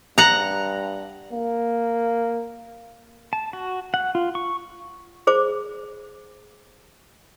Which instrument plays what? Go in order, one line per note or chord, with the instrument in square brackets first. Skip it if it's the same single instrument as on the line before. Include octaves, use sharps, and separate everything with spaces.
[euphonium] G2 [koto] F#5 A#5
[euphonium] A#3
[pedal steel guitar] A5
F#4
F#5
F4
C#6
[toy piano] G#4 C5 D6